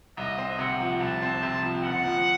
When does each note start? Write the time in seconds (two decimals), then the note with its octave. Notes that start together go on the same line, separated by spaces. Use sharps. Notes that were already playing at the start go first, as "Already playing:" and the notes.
0.17 C2 D#5
0.38 C4
0.59 C3 F#5
0.80 F3
1.00 C2 A5
1.22 C4
1.43 C3
1.62 F3
1.83 F#1 F#5
2.05 F3